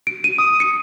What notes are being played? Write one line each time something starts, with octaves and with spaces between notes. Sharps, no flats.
D7
D#7
D#6
C#7